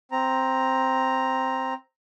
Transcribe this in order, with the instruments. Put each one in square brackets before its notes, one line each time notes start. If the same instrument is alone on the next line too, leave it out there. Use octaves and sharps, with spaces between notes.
[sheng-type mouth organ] C4 A#5